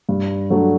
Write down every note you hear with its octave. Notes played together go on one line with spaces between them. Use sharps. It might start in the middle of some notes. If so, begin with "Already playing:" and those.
G2
F#3 A3 D4 F#4